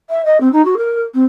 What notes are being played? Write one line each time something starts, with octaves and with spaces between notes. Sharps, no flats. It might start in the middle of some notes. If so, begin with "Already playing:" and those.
E5
D#5
C4
D#4
F#4
A#4
C4